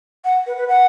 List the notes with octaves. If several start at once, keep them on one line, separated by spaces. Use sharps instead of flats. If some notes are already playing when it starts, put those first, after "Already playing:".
F#5
B4
B4
F#5